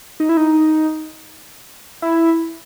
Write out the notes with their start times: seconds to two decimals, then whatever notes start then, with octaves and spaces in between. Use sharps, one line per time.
0.20 D#4
0.29 E4
0.37 D#4
2.02 E4